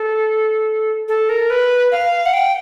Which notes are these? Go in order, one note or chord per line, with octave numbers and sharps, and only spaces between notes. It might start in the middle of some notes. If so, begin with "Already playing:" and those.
Already playing: A4
A4
A#4
B4
F5
F#5
G5